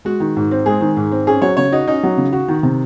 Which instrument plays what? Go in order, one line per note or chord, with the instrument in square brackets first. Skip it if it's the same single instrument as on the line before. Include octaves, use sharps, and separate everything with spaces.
[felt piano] G#3 [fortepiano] F#4
[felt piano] D#3
G#2
C4
[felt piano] G#3 [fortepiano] G#4
[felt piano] D#3
G#2
C4
[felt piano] C#4 [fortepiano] G#4
[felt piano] F#3 [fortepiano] C#5
[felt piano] C#3 [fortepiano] C#5
[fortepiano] D#4 [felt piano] F#4
[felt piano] C#4 [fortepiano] D#4
[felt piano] F#3
C#3
F#4
D#3
C3